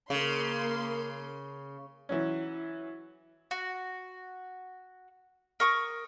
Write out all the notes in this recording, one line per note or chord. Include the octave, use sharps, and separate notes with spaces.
C#3 A#3 C6
E3 F#3 C#4
F#4
A#4 C#6 D#6